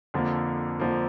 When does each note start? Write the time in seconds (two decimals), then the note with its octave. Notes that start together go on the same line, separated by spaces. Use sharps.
0.14 F2 D3 F3 A#3
0.80 F2 D3 F3 A#3